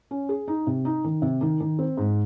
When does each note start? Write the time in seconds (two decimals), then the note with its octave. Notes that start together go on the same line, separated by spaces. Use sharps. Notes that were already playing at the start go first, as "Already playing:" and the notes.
0.11 C#4
0.29 G#4
0.48 D#4
0.67 C3
0.85 D#4
1.04 D#3
1.22 C3
1.41 D#3
1.60 D#3
1.79 C4
1.97 G#2